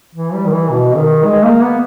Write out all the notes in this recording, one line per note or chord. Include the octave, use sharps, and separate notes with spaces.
E3
G3
D#3
E3
B2
D#3
G#3
A#3
B3